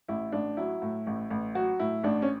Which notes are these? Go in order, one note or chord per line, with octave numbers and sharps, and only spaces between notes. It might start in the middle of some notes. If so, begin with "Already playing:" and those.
A1 E4
A1 D4
F#3 E4
A2
A1
A1
F#3 F#4
A2 E4
A1 D4
C#4